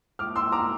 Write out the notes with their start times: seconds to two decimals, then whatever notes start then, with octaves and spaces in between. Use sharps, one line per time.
0.19 D6 F6
0.36 C6 E6
0.52 A#5 D6